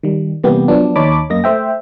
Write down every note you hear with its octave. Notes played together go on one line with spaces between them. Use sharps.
D#3 G3
C3 E3 G3 A#3 B3 G4
F3 F#3 B3 D4
D#2 D#4 C#5 A5 B5 D6
F#2 A#3 D#5 A#6
A3 C5 E5 G5